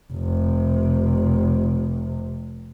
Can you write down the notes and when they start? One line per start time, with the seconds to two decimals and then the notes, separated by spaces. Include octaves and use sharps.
0.13 F1 C3